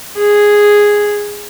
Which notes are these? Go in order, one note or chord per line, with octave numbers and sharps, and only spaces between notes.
G#4